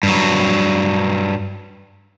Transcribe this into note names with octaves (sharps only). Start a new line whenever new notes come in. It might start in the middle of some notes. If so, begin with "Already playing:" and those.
G2 F#3